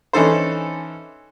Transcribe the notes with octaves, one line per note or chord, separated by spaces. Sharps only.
E3 C#4 D#4 A4 C5